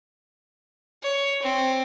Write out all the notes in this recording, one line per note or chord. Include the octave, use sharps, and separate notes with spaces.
C#5
C4